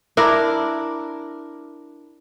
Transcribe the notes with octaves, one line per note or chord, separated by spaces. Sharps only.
D4 E4 A#4